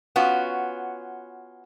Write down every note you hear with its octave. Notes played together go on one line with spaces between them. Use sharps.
B3 C#4 F4 F#4